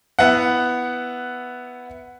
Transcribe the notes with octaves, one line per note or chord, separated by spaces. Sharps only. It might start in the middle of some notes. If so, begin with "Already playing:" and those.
B3 E4 F#5